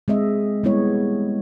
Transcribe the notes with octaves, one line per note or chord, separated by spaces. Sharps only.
G#3 C4 D#5 E5
G3 G#3 B3 E4 C#5